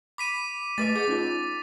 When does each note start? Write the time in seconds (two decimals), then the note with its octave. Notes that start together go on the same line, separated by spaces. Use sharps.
0.18 B5 D6 B6 D#7
0.78 A3 B4 D#5 D6 A6
0.96 G#4 D6
1.08 C#4 D#4 F4